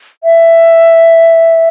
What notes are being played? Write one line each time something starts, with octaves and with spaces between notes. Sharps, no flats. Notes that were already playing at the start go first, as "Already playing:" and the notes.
E5